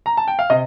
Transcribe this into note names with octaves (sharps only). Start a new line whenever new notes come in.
A#5
A5
G5
F5
C3 D#5